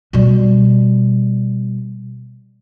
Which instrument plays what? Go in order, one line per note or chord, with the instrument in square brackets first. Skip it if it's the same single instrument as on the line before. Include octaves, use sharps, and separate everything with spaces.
[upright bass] B2 G3